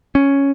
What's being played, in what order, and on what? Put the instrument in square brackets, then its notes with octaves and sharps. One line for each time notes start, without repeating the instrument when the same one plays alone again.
[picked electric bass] C#4